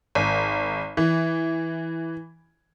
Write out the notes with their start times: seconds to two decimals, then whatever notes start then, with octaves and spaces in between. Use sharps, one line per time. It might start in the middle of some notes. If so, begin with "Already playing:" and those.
0.15 G#1
0.97 E3